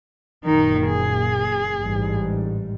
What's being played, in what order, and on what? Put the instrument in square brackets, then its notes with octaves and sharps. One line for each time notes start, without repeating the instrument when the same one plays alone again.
[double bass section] F#1 F#2 A#2 [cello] D#3 D#4
[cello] G#4
[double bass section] A1 G#2 G3